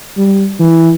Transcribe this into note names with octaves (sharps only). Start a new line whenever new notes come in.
G3
E3